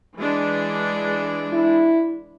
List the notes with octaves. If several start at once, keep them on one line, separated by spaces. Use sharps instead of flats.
E3 G#3 D4
E4